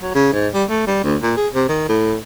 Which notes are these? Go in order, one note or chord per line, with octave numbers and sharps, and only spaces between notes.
F#3
C#3
G#2
G3
A3
G3
D2
A#2
G#4
C3
D#3
A2